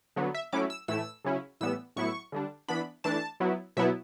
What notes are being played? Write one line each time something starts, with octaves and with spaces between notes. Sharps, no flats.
D3 F#3 B3
E5
F#3 A3 C#4 E4 D6
E6
A2 E3 A3 E4 E6
C#3 F#3 C#4 E4
A2 E3 G3 B3 E6
A2 F#3 B3 E4 C#6
D3 G3 D4
E3 B3 D4 B5
E3 A3 D4 A5
F#3 B3 E4
B2 F#3 B3 E4 E5